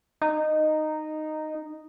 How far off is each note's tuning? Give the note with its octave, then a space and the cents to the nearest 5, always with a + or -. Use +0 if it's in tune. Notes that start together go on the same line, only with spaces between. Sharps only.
D#4 -10